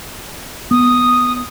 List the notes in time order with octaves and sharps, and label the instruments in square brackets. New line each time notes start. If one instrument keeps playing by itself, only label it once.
[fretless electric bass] B3 [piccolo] D#6